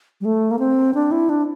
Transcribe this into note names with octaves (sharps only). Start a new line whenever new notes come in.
G3
A3
A#3
C4
D4
E4
D4